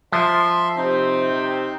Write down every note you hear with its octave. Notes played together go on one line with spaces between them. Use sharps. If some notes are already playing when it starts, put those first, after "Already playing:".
F3 E5 C6
C3 C4 D#4